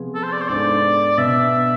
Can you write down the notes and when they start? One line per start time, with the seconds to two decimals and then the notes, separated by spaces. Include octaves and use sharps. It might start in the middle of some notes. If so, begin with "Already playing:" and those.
Already playing: C3 F3 B3 F4 G#4
0.15 A4
0.23 C5
0.33 D5
0.41 C5
0.49 G#2 G#3 B3 D4 A4 D5
1.18 B2 B3 D4 E5